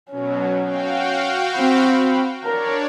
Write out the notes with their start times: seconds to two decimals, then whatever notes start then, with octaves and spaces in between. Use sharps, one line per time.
0.12 B2 F#3 C#4
0.63 F#4 F5 G5
1.56 C4 B5
2.44 D4 A#4 C#5 D5